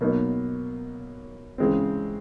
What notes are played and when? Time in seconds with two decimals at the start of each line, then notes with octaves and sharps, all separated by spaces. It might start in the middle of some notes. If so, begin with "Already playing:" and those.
0.01 B2 F#3 A#3 D#4
1.58 C#3 E3 G#3 C4